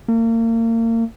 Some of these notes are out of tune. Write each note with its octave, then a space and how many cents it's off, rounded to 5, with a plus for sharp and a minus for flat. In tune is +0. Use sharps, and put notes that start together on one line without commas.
A#3 -35